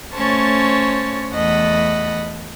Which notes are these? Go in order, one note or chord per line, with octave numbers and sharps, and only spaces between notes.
A3 C#4 C5 C#5 A5 A6
E2 A3 D#5 F#5 A5 B5